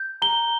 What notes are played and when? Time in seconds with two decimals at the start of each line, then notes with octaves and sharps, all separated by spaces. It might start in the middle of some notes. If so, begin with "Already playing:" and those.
Already playing: G6
0.22 A#5 G7